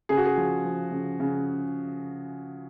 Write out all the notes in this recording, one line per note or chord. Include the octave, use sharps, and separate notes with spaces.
C#3 G#4
F#4
G#4
F3
F3
C#3
C#3